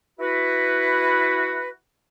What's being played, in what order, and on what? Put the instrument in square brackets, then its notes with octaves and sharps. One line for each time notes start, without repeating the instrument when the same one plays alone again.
[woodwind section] E4 F#4 B4